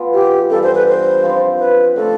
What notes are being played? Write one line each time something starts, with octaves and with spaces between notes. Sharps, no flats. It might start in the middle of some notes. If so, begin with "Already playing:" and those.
Already playing: E3 B3 F4
G4
G2 E3 G3 A4
C5
B4
C5
F3 C4 E4
B4
D3 F3 A3 A4